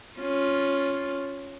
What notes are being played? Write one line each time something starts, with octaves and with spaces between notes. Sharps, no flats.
C#4 F4